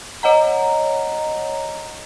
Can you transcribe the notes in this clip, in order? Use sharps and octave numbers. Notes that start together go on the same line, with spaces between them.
C#5 D#5 F#5 A#5